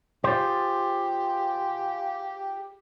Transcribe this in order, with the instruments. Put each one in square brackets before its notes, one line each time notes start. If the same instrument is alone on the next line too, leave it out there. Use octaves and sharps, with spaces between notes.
[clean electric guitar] F4 G#4 C5 [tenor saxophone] G4